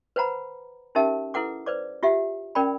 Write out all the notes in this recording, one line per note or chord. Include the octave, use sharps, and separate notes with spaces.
B4 C5 F#5 A#5 B5
C#4 D#4 G4 A#4 E5 A5
E4 A4 B4 F#5 D6
B4 C5 D5 D6
F4 G4 E5 F#5
C#4 A#4 D5 G5 B5